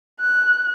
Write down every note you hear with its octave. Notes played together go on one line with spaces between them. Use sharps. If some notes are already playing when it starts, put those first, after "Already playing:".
F#6